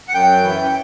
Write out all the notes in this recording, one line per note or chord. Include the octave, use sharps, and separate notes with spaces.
F#5
F#2 G5
E3